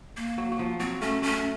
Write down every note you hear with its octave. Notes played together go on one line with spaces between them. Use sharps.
A#3
F#3
F#3
F3
F#3 C4
A3 C#4
A3 C#4